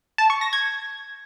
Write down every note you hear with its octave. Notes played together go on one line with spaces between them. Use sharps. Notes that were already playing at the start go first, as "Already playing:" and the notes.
A5
C#6
A#6
G#6